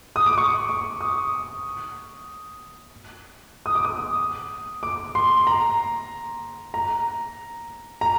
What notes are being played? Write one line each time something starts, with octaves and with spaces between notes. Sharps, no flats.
D#6
D6
C#6
D6
D#6
D#6
D6
D#6
D6
C6
A#5
A#5
A#5